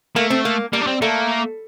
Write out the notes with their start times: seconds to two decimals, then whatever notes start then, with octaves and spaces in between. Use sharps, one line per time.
0.16 A3 A#3
0.30 C4
0.45 A#3
0.73 G3 A#3
0.81 D4
0.87 C4
1.02 A3 A#3